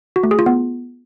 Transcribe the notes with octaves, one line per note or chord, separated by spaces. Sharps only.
F#4
A3
G#4
F4
B3